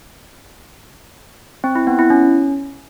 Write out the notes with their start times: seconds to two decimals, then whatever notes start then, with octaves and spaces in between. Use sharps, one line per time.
1.64 C4
1.75 E4
1.87 B3
1.99 E4
2.10 C#4